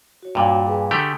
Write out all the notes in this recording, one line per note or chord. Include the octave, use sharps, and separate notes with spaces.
F#4 C#5
G2 A#2
G#4 B4 G#5
D3 A3 G4 G#5 A#5 D#6